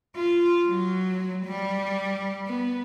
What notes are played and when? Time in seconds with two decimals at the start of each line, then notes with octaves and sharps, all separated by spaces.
0.16 F4
0.66 F#3
1.46 G3
2.47 B3